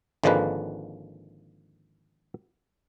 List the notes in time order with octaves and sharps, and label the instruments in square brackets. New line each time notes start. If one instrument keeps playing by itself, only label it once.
[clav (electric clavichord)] G#1 D3 F3 G#3 A#3 B4